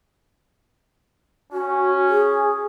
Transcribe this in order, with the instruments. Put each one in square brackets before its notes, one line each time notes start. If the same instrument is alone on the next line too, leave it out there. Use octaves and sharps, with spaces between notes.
[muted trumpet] C#4 [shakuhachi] F#4
[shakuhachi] G#4